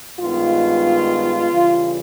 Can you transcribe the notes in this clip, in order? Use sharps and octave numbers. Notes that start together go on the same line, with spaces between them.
G2 D#3 G#3 B3 F4
C#3 E3 G3